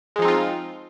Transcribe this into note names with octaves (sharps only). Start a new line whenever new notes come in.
F3 G#3 C4 D#4 F4